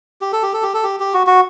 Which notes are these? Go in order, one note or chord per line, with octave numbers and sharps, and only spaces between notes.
G4
A4
G4
A4
G4
A4
G4
G4
F#4
F#4